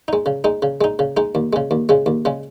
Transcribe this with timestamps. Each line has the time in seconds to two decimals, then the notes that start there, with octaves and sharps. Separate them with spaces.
0.08 G#3 D#4
0.26 C#3
0.44 G#3 D#4
0.62 C#3
0.81 G#3 D#4
0.99 C#3
1.17 G#3 D#4
1.35 D#2
1.53 C#3 G#3
1.71 D#2
1.89 C#3 G#3
2.06 D#2
2.25 C#3 G#3